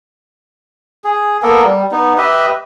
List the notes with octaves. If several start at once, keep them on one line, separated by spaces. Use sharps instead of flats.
G#4
A#3 B3 A4 A#4
G3
B3 D#4
G4 B4 D#5 E5